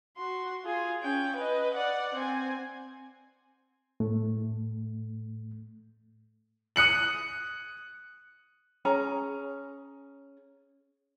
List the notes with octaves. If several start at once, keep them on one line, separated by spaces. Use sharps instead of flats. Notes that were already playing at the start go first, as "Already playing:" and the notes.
F#4 C6
F4 G#4
C#4 G5
B4 D#5
D5 F#5
C4 G#5
A2 A3
D#6 F#6 C#7 F#7
C#4 G#4 A#5